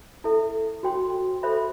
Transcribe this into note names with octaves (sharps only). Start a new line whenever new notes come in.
E4 A4 E5
F#4 C5 G5 C6
A4 C5 E5 B5